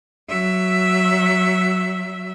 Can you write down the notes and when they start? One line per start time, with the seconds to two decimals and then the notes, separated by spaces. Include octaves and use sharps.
0.29 F#3 E5